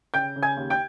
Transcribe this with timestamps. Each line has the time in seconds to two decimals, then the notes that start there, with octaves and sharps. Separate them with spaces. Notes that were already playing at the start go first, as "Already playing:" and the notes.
0.14 C#3 G5 G6
0.36 C#3
0.42 G#5 G#6
0.57 D#2
0.70 G5 G6